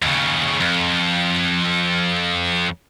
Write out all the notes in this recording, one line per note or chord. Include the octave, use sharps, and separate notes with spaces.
D#2 C#3
F2